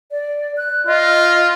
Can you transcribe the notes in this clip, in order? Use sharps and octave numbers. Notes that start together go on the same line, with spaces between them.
D5
F#6
F4 D#5